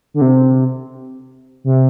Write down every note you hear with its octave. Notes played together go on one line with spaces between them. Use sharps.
D3
C3
C3